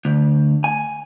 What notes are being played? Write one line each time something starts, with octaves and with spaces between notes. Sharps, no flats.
D2
G#5